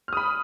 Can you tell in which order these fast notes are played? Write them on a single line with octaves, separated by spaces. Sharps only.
F6 D#6 B5